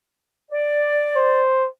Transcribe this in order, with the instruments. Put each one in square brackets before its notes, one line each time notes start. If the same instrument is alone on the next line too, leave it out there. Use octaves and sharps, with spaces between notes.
[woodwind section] D5
[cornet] C5